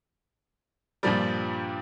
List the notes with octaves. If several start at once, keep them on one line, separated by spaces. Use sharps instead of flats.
G2 A#2 F3 G3